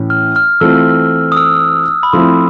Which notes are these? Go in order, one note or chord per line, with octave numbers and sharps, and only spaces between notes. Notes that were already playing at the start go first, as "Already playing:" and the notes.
Already playing: A2 E3 C#4
F6
F6
E3 A3 C4 F4 E6
D#6
E6
B5
F3 A3 C4 E4 C6